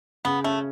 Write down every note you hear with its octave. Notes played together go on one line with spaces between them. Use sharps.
C#3 B3
A3 C#4